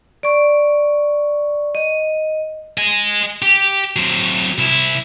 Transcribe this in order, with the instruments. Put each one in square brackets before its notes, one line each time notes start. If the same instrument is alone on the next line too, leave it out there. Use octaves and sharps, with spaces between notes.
[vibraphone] D5 C#6
D#5
[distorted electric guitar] D#5 G#5
G4
F#3 C4
C2 E4